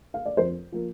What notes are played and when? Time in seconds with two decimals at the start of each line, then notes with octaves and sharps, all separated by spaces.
0.14 F5
0.25 D5
0.37 F2 C5
0.72 F3 A#3